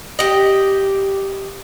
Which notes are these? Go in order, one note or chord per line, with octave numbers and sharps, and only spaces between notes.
G4 D#5